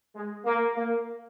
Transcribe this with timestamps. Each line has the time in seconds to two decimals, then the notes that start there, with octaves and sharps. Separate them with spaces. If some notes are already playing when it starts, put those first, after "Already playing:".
0.16 G#3
0.45 A#3
0.75 A#3